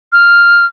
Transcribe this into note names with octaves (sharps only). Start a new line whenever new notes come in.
F6